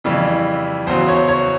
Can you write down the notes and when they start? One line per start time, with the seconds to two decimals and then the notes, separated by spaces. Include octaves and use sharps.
0.04 F2 C#3 E3 G3
0.87 E2 C#3 F#3 C5
1.08 C#5
1.28 C#5